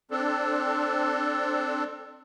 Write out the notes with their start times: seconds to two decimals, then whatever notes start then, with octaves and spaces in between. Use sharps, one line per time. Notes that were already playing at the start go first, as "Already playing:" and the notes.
0.11 C4 D4 A4